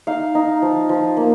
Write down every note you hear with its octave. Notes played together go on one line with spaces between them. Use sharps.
D#4 F5
D#4
F3
F3
A#3